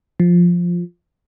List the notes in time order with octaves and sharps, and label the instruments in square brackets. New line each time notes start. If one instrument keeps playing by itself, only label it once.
[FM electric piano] F3